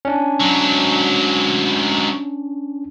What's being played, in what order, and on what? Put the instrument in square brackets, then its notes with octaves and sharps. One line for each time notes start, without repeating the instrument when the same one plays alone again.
[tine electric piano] C#4 D4
[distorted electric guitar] G#2 F#3